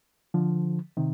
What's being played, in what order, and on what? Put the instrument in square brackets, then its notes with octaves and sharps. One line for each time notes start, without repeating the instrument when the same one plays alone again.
[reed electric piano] D3 F3
C3 D#3